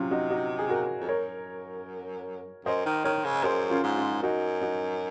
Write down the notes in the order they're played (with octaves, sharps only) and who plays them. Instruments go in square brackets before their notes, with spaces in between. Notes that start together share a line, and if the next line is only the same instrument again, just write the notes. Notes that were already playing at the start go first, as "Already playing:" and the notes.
Already playing: [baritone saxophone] C3 [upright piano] F#3 C#4 F4
[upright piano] D#4 F#4
D#4 F#4
G#4
F#4 A#4
[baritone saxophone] F2
[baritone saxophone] F#2 [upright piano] A#4 C#5
[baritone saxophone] F#2 [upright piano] C5 D#5
[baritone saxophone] D#3
[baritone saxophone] D#3 [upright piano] A#4 C#5
[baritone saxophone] C#3
[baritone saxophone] F#2 [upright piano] G#4 C5
[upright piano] C#4 F4
[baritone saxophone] G#2
[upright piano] C#4 F4
[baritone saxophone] F#2 [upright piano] D#4 F#4
[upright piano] D#4 F#4